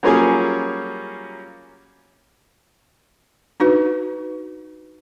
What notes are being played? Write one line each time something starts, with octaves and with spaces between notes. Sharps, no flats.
F#3 G3 A#3 C#4 F4 G#4
D4 D#4 F#4 B4